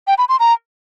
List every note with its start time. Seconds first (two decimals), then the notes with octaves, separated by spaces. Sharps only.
0.07 G5
0.18 B5
0.29 C6
0.40 A#5